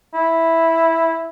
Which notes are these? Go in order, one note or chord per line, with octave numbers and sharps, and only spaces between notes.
E4